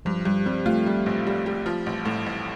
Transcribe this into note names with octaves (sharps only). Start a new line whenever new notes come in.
G2 F3
G2 G3
G3 C4
A3 F4
G3
A1
G3
G3
F3
A1
A2
A1